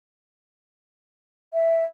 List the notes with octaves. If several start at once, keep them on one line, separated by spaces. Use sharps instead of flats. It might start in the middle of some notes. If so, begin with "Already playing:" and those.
E5